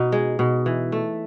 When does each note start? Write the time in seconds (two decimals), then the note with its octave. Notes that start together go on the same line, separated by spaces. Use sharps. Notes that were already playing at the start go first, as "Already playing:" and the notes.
Already playing: B2 D#4
0.12 G#3
0.39 B2
0.66 E3
0.92 A3